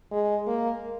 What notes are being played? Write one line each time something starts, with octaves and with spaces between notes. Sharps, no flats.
G#3
A#3